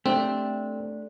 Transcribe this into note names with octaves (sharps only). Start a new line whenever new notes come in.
A3 C4 D4 G4